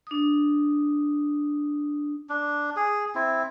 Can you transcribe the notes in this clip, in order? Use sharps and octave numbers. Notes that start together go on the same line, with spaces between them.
D4 D#6
D4
G#4
C4 E4